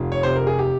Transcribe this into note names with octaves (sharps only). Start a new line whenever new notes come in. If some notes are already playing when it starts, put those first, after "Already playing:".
Already playing: F1 F4
C#5
C3 C5
A#4
G#4
G4